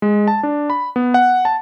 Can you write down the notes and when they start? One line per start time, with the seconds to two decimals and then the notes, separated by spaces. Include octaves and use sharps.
0.02 G#3
0.28 A5
0.43 D4
0.70 B5
0.96 B3
1.14 F#5
1.45 A5